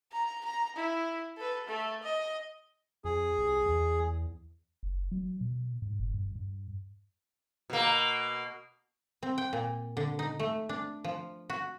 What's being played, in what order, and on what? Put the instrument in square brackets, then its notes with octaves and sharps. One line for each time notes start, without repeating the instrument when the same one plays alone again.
[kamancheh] A#5
A#5
E4
A4 B4
A3 A4
D#5
[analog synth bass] F2 [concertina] G#4
[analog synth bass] C2
E2
[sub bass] F#1
F#3
B2
G#2
F#1
G2
G2
[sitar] B2 A#3
[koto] C4
G5
A#2
D3
D#4
A3
D4
F3
F#4